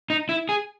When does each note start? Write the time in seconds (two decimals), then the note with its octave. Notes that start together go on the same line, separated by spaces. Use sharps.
0.10 D#4
0.29 E4
0.49 G#4